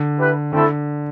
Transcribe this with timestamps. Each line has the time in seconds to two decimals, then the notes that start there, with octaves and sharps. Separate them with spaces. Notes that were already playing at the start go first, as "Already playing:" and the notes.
Already playing: D3
0.18 E4 G4 B4
0.52 D3 A3 C4 E4 A4